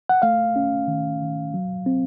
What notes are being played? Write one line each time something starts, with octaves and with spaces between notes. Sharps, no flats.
F#5
A3 F5
C#4
D#3
D#3
F#3
C4